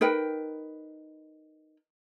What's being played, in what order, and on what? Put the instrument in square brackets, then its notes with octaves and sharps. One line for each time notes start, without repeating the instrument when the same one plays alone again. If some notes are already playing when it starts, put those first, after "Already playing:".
[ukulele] D#4 A#4 B4 G5